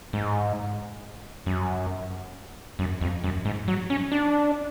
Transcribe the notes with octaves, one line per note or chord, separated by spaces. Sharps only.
G#2
F#2
F#2
F2
F#2
G#2
F#3
C#4
D4